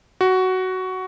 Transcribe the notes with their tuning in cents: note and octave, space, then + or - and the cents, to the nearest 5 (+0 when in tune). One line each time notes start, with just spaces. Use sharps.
F#4 +10